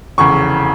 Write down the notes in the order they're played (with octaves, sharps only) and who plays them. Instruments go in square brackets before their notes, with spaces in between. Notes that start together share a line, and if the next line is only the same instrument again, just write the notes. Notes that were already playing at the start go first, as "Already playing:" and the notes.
[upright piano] F1 E2 C#3 C#6